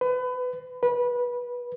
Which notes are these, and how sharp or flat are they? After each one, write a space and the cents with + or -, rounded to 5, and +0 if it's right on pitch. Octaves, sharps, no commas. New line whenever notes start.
B4 +30
B4 -20